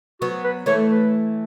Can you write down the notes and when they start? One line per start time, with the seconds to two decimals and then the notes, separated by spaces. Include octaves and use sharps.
0.21 F#3 B3 F#4
0.44 B4
0.66 E3 A3 C#5
0.89 B4